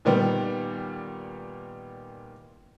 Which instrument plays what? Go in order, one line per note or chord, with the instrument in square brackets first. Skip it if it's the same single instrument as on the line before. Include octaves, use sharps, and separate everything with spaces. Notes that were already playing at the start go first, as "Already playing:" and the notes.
[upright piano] A#2 D#3 G3 B3